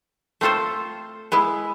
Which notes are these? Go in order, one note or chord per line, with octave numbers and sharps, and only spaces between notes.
A3 C4 F4 A4 C5
G#3 B3 E4